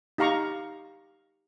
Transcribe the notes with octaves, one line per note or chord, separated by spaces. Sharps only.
D#4 G4 F5 A#5 C#6